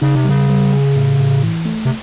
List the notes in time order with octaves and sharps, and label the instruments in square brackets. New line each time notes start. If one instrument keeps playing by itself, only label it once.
[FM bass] C#3 [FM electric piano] D#4
[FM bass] C3
[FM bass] C#3 [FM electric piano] G3
[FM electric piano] G3
G#4
A2
A2
E3
A3
[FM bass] C3